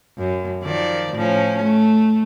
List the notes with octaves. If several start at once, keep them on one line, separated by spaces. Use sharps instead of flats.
F#2
D#3 F3 D5
A2 F3 C#4
A3